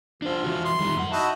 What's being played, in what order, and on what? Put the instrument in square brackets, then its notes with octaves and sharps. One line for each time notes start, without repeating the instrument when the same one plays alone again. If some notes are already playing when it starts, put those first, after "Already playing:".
[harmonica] F3 [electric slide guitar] D4 C5
[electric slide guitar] E3 F#4
[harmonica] C6
[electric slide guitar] D#3 G3 D#4
F#2 F#5
[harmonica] D#4 E4 F#4 [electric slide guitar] A5